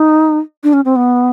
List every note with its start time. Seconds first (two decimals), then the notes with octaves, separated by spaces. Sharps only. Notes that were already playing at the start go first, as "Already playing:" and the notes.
Already playing: D#4
0.64 D4
0.73 C#4
0.85 C4
0.96 B3